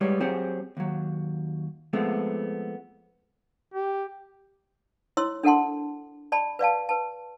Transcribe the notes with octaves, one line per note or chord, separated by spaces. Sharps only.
G3 G#3 B4 C#5
F#3 C4 G4 G#4 C5 C#5
D#2 F#3
F3 G#3 A3 B3 C4
G4
E4 C#5 C6 E6
D4 A4 A#4 F#5 A5 C6
D5 A5 B5
B4 D5 F5 A5
B4 A5